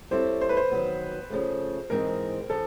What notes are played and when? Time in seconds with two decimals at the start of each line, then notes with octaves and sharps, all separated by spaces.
0.11 G3 C4 E4 A4 C5 C#5
0.41 C5
0.49 B4
0.57 C5
0.71 D#3 F#3 B3
1.30 C#3 F3 A3
1.90 G#2 E3 G#3 C4 D#4 A#4
2.50 C#3 F3 A4